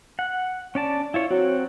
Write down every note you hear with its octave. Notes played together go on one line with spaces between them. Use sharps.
F#5
C#4 D5 A5
E4 F4 C#5
F#3 C4 F#4